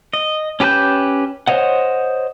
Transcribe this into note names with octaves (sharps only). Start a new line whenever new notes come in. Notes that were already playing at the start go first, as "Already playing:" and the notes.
D#5
C#4 G4 B4 A5 G6
C5 C#5 D#5 F#5